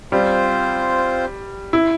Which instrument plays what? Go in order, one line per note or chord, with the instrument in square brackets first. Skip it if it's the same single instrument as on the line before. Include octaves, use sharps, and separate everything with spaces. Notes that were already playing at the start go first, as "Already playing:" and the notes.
[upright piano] G3 [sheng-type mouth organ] C4 F4 C5
[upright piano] E4